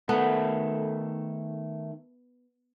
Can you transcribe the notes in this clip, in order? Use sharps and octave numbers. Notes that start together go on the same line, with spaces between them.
D#3 A3 B3 A4